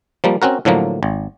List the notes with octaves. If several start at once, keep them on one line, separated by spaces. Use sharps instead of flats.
F3 G3 A#3
C4 C#4 F#4 A#4
A2 D3 F3 F#3 A#3
G#1